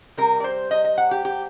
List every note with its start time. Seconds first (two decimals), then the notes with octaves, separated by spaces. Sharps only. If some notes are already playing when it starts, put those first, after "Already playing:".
0.17 C3 G3 A#4
0.40 D5
0.44 C5
0.71 D#5
0.84 D#5
0.98 F#5
1.11 G4
1.25 G4